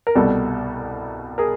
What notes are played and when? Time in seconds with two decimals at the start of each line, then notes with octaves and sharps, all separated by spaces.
0.07 A#4
0.15 C2 B2 G3 A4
1.38 G#4 A#4